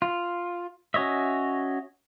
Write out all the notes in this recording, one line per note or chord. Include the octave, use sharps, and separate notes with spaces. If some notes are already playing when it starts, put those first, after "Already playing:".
F4
C#4 F#4 C#5 D#5 E5